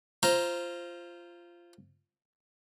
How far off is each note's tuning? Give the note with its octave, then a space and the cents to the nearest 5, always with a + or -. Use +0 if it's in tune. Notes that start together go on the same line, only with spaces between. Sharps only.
F4 -15 C5 +5 A#5 +5